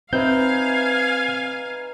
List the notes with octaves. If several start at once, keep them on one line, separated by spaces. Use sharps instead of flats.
C4 D#4 B4 E5 F5 G#5 G6